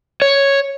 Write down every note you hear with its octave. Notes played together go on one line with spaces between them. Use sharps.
C#5